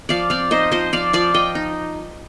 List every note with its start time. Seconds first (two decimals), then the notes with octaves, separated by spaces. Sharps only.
0.09 F3 D5 F5
0.30 C4 D5 F5
0.51 D#4 C5 D#5
0.71 F3 C5 D#5
0.93 F3 D5 F5
1.13 F3 D5 F5
1.34 F3 D#5 G5
1.55 D#4